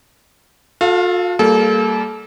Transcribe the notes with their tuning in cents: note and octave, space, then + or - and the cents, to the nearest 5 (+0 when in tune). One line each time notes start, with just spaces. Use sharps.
F4 +45 A4 -5 F5 +0
G3 +0 A#3 -20 A4 -35